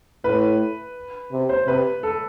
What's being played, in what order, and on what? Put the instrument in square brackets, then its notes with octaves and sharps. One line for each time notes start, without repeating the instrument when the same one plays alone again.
[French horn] A2 [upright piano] B4
[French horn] C3
[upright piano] C5
[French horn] C3 [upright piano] B4
[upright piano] A4